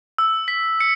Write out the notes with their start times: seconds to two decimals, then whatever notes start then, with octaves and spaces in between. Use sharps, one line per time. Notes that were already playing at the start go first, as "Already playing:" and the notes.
0.18 E6
0.48 B6
0.80 C#7